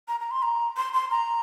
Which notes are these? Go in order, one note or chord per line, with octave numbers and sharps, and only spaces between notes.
A#5
A#5
C6
A#5
C6
C6
A#5